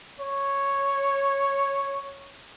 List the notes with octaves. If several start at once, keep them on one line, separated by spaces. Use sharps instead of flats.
C#5